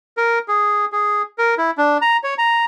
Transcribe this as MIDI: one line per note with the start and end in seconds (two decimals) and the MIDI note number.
0.17 0.39 70
0.48 0.85 68
0.92 1.22 68
1.38 1.55 70
1.58 1.71 64
1.78 1.98 62
2.02 2.17 82
2.24 2.34 73
2.38 2.65 82